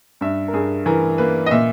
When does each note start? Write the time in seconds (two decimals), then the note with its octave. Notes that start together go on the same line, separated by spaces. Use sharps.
0.21 G2 E5
0.48 A#4
0.53 G2 G#4
0.86 E3 A#4
1.18 A#3 B4
1.46 D#5
1.51 A#2 E5